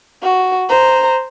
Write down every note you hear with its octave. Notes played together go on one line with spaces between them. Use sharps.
F#4
C5 A#5